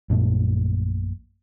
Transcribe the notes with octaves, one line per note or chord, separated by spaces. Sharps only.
A#1 F#2 A#2 A3